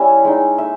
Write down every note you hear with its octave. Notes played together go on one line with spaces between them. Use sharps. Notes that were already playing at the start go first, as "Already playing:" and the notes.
Already playing: G3 C#4 E4 E5
G#3 D#4
E5